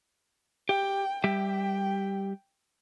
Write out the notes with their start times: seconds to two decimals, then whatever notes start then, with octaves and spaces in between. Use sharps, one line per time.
0.69 G4 G5
1.24 G3 G4 E5 G5